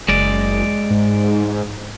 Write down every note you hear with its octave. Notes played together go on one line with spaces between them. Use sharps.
F#1 G#3 D5
G#2